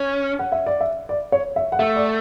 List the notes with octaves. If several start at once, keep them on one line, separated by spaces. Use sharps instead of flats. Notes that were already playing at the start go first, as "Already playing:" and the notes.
Already playing: C#4
F#5
E5
D5
E5
D5
C#5
E5
F#5
A3 E5
D5